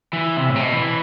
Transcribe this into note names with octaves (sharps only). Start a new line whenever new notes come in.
E3
C3
A2
C3
B2
E3